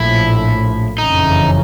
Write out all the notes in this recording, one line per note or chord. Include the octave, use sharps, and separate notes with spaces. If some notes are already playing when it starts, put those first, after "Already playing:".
Already playing: A#1 A2 F3 E4
F#1 F2 C#3 E3 D#4